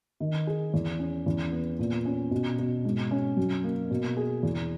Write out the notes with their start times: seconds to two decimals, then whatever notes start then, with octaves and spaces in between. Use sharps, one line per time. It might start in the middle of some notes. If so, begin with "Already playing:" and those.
0.20 D#3
0.47 G#4
0.74 E2
0.99 C#4
1.26 E2
1.52 B3
1.79 A#2
2.05 C#4
2.31 B2
2.59 B2
2.85 G#2
3.11 C#4
3.37 F#2
3.63 A#3
3.91 B2
4.17 G#4
4.43 E2